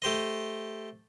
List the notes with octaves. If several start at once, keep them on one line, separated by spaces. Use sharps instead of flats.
A3 G4 C5 D#5